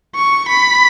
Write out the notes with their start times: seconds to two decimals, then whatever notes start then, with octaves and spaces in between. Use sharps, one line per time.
0.15 C#6
0.48 B5